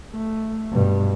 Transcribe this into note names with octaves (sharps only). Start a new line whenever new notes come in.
A3
G2 B2